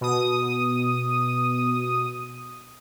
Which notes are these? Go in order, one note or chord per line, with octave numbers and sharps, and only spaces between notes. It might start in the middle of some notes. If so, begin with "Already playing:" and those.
B2 D#6